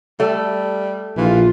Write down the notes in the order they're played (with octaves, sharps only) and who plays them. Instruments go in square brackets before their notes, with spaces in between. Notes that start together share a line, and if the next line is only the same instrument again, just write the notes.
[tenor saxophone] G3 [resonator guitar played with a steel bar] A3
[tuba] A#1 [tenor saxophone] E3 [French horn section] F4